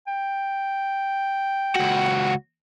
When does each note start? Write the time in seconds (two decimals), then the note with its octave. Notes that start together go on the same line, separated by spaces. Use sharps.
0.07 G5
1.76 C#2 F#4